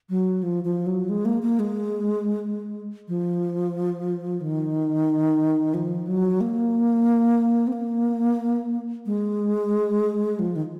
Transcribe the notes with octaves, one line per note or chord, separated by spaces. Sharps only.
F#3
F3
F3
F#3
G#3
A#3
A#3
G#3
F3
D#3
F3
F#3
A#3
C4
A#3
G#3
F3
D#3